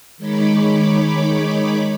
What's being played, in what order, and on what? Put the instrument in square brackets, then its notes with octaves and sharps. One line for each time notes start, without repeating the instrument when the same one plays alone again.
[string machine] D#3 G#3 D#4 C#5 B5 D6